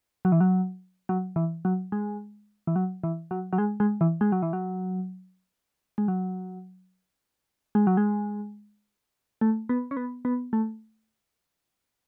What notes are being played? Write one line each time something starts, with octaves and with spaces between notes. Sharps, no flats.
F#3
E3
F#3
F#3
E3
F#3
G#3
E3
F#3
E3
F#3
F#3
G#3
G#3
E3
G#3
F#3
E3
F#3
G#3
F#3
G#3
F#3
G#3
A3
B3
C#4
B3
B3
A3